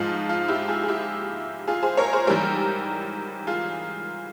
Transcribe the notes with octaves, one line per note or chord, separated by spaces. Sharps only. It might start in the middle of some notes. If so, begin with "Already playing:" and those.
Already playing: G#2 F3 G#3 F4
F4
E4 G4
F4 G#4
G#4
E4 G4
F4 G#4
G#4 C5
A#4 C#5
G#4 C5
G#2 E3 G3 G4 A#4
F4 G#4